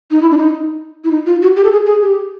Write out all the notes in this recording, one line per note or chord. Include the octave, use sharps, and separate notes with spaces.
D#4
E4
D4
D#4
E4
D#4
F4
F#4
G4
A4
G#4
G#4
G4